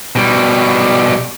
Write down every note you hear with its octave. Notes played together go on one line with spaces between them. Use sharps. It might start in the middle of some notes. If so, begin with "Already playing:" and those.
B2 G3